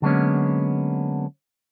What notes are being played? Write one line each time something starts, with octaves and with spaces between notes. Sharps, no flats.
D3 F#3 G#3 A#3 B3 C#4